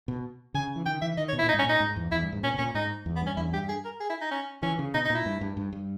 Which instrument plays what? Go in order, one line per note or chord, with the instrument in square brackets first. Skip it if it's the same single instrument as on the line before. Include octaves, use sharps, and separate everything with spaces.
[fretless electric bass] B2
[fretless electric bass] C#3 [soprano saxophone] G#5
[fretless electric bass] E3
[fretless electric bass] D#3 [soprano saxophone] G5
[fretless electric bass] E3 [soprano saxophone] E5
[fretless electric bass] D#3 [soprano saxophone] D#5
[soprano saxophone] C#5
[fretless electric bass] B2
[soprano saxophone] E4
[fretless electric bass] A#2 [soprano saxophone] D#4
[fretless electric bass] G#2
[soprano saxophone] C#4
[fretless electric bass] A#2
[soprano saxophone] D#4
[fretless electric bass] G#2
E2
[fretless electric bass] E2 [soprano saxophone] E4
[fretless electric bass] G2
G#2
[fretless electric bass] A#2 [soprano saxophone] C#4
[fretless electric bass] B2
[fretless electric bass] A#2 [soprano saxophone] C#4
[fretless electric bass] G#2 [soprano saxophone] D#4
[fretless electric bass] E2
[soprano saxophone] B3
[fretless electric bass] G2
[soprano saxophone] C#4
[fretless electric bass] E2 [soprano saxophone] E4
[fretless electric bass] G2 [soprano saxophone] G4
[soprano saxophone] G#4
A#4
G#4
E4
D#4
C#4
[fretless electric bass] E3 [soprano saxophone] C#4
[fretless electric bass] C#3
[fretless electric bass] B2 [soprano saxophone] D#4
[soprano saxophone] D#4
[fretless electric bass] A#2 [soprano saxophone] E4
[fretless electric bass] G2
G2
G2
G2